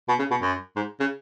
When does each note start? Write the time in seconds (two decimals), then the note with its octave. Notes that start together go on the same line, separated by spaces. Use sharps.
0.08 B2
0.19 C#3
0.31 B2
0.42 F#2
0.76 G#2
1.00 C#3